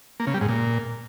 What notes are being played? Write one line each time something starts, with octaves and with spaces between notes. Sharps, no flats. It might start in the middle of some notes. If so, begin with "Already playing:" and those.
A#3
C#3
G3
G#2
A#2